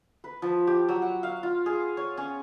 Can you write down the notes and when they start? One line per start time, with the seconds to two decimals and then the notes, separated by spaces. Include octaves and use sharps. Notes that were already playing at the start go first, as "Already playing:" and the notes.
0.24 B4
0.42 F3
0.67 G4
0.88 F#3
1.02 F#5
1.23 F5
1.43 F4
1.66 G#4
1.97 C#5
2.17 C#4